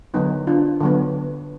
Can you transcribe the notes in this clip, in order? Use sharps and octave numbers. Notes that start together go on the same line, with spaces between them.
D3 F#3 B3 D#4
D4 F4
D3 F#3 B3